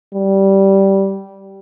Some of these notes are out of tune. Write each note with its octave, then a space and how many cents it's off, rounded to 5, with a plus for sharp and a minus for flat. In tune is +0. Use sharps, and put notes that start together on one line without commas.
G3 -10